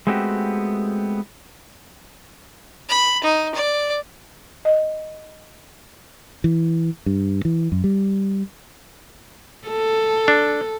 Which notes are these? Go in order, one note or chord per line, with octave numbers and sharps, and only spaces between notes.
G#3 A3 B3 C4 F#4 G4
B5
D#4
D5
D#5
E3
G2
E3
F#2
G3
A4
D4